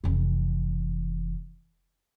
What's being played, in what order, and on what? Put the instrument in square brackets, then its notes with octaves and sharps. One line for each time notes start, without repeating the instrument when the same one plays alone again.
[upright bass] F1 E3